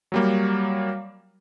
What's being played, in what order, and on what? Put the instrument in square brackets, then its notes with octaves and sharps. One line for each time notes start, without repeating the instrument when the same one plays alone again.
[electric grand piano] F#3 G3 A#3